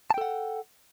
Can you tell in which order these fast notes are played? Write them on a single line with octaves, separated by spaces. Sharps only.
A5 G5 A4 F#5